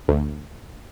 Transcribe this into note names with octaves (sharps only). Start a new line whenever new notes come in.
D2